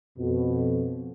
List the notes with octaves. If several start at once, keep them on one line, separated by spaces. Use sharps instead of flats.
F2 B2